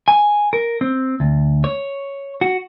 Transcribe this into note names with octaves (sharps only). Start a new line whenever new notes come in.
G#5
A#4
C4
D2
C#5
F#4